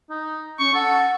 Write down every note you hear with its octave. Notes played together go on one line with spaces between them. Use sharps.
D#4
C#4 C#6
A4 F#5